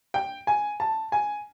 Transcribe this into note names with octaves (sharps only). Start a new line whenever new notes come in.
G5
G#5
A5
G#5